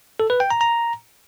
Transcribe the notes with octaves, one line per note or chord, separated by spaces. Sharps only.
A4
B4
G5
A#5
A#5